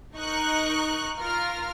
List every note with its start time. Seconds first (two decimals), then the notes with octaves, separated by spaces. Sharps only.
0.16 D#4 A#4 C#6 F#6 C#7
1.19 F4 A#4 F6